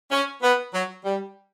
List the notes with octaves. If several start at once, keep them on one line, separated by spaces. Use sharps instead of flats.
C#4
B3
F#3
G3